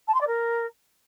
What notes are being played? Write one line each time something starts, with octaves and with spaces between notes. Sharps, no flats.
A5
C6
D5
A#4